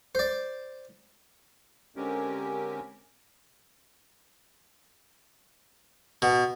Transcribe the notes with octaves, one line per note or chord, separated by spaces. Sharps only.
C5 D5
D3 G#3 C4 C#4 G4 A#4
B2